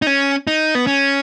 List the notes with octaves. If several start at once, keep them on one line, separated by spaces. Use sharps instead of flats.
D#4
C#4
D#4
B3
C#4